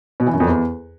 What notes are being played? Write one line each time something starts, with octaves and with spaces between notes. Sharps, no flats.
B2
E3
F#2
F2
E2